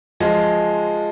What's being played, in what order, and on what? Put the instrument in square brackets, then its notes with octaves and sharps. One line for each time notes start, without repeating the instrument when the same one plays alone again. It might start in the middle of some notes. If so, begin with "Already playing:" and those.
[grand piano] F3 G#3